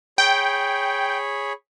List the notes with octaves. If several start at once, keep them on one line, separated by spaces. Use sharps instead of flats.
G#4 C#5 G5 B5